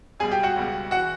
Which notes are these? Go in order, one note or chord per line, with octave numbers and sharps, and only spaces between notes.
C#2 B2 G3 G#4 G#5
G4 G5
F#4 F#5
C#2 B2 G3
E3 F#4 F#5